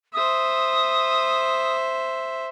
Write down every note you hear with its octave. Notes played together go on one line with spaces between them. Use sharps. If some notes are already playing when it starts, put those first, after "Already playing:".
C5 E5 D#6